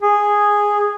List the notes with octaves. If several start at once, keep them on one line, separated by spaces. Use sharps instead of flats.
G#4